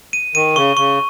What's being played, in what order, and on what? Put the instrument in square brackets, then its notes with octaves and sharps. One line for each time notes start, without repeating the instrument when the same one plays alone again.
[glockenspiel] D#7
[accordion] D#3 [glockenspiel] D#7
[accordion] C#3 [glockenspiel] C#6
[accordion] C#3 [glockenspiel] C#6